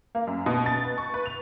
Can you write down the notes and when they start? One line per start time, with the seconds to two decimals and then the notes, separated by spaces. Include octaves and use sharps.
0.15 A#3
0.27 F#2
0.46 B2
0.66 A6
0.84 B4
0.98 C#6
1.14 B4
1.26 F7